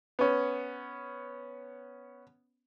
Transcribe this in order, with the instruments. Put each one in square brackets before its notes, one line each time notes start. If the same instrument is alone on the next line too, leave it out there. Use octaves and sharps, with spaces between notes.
[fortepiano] B3 C#4